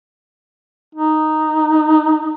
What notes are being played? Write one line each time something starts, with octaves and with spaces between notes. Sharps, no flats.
D#4